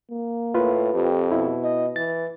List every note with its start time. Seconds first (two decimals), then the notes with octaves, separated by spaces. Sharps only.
0.11 A#3
0.55 A2 F4 B4
0.94 F2 G4
1.32 B2 E4
1.64 D#5
1.96 E3 A6